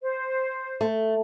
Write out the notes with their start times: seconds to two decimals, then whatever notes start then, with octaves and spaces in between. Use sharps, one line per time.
0.02 C5
0.81 A3